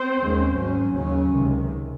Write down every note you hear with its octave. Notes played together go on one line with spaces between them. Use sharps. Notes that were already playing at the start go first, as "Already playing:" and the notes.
Already playing: C4 C5
D#2 D#3 G#3 C#4
G#1 G#2 F#3 C#4
D#2 C#3 F#3 C#4
C#2 C3 D#3